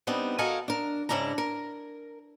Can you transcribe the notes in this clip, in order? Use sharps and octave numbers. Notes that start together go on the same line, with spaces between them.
G3 B3 C4 D4 D#4
F#4 A4 A#4 D#5 F5 G#5
D4 A#4
G#2 C#3 D4 E4 A#5
A#4